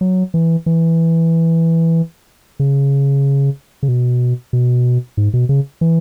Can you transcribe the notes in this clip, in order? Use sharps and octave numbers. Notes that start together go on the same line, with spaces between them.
F#3
E3
E3
C#3
C#3
B2
B2
G#2
B2
C#3
E3